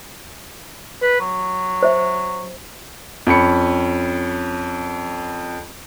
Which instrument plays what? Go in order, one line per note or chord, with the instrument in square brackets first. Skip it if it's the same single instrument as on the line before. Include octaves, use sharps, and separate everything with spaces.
[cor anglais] B4
F#3
[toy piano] C5 E5
[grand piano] F2 C#4 B5 C#7